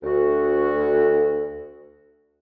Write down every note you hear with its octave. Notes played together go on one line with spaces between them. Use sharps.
D2 F#4